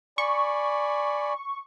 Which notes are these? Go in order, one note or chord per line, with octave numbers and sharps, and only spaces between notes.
D5 G#5 B5 C#6